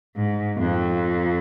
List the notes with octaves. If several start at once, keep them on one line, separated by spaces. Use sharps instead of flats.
G#2
F2